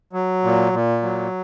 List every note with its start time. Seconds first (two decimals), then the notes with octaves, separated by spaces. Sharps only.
0.13 F#3
0.44 A#2
0.73 A#2
1.02 F#3